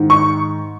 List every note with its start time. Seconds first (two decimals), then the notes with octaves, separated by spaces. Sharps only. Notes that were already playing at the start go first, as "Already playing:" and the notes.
Already playing: G#2 D#3
0.10 C#6